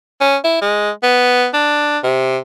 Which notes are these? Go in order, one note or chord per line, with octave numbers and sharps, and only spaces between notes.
C#4
E4
G#3
B3
D4
C3